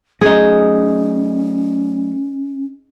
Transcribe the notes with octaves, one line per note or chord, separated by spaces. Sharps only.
F#3 A3 C#4 D#4 G#4